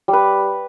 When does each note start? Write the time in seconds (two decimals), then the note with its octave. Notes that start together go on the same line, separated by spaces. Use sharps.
0.08 G3
0.13 B4